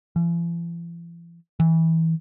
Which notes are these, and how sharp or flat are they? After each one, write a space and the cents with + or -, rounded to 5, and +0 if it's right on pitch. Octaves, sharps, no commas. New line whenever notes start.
E3 +45
E3 -20